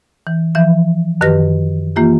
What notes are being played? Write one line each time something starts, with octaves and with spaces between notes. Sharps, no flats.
E3
E3 F3 E5
F#2 D#3 G4 B4 F6 A#6
E3 A#3 F4 G4